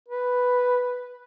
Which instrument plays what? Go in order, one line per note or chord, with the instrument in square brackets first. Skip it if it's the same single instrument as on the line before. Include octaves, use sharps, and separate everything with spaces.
[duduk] B4